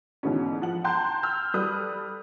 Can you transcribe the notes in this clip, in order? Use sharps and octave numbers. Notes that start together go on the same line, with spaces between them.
G#2 B2 D3 E3 C#4
F3 F#5 F#7
G5 A5 A#5 C6 F#6 G6
E6 F6 G6
G3 A4 B4 D#6 F#6